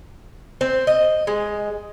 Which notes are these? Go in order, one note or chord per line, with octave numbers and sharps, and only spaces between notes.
C4
D#5
G#3